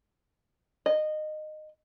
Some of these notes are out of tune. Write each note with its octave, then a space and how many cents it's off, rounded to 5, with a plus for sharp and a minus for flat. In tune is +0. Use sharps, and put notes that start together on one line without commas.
D#5 -20